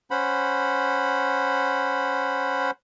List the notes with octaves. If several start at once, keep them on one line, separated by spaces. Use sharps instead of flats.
C#4 C5 F#5 B5